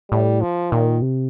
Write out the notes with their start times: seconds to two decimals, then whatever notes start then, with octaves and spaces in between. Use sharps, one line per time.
0.11 A2 G3
0.41 F3
0.72 A#2 D#3
1.02 C3